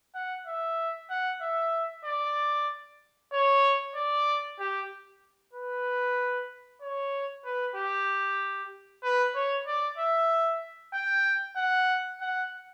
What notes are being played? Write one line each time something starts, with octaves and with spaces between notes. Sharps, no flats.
F#5
E5
F#5
E5
D5
C#5
D5
G4
B4
C#5
B4
G4
B4
C#5
D5
E5
G5
F#5
F#5